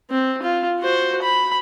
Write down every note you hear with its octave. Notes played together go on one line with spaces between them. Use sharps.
C4
F4
F#4 C5
B5